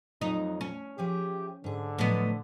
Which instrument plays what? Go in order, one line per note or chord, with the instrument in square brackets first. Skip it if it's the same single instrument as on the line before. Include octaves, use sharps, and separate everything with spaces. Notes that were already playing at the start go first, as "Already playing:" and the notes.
[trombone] F2 [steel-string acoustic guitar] F#3 [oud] D#4
[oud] C#4
[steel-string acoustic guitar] F3 G#4 E5 [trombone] G4
[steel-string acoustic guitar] G#2 G#4 [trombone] D3
[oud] A2 B3 [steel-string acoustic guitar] F3 F#3 D#5